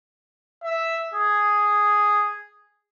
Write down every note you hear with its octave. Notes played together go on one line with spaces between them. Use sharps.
E5
G#4